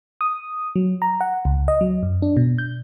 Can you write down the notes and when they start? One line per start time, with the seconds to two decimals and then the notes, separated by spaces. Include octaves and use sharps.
0.21 D#6
0.76 F#3
1.02 A#5
1.21 F#5
1.45 C#2
1.68 D#5
1.81 F#3
2.03 F#2
2.22 D4
2.37 B2
2.58 G6